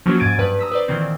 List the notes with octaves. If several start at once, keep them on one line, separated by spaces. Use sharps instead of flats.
F3 F#3 A#3 C#4 F#4
G#2 G#6 A6 D7 D#7
G2 B4
A#5 D#6 E6 B6
B4 C5 D5
A#2 D#3 E3 C4